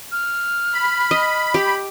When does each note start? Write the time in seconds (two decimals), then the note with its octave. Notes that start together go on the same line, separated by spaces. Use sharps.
0.12 F6
0.74 B5
1.11 D#5
1.54 G4